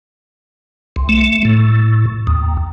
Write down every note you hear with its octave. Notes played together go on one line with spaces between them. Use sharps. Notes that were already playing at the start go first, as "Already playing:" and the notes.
C2
A3
A2
D#2